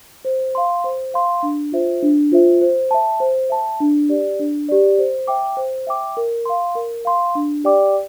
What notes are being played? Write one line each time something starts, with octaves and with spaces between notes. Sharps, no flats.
C5
F5 C6
C5
F5 C6
D4
F4 C5 E5
D4
F4 C5 E5
C5
E5 A5
C5
E5 A5
D4
G4 D5
D4
G4 D5
C5
E5 G5 D6
C5
E5 G5 D6
A#4
F5 C6
A#4
F5 C6
D4
G4 D5 G5 D6